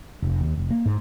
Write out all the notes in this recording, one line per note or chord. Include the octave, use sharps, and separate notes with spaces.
F1
D#2
F1
A#3
G#2